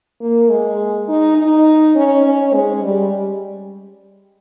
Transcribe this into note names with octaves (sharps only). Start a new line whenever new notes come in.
A#3
G#3
D#4
D#4
C#4
C#4
G#3
G3